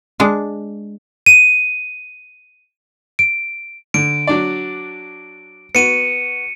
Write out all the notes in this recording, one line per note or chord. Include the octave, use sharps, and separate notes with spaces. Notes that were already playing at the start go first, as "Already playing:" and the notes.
G#3 D4
D#7
D7
D3 D7
F#3 D4 D5
B3 F#4 C#7 D#7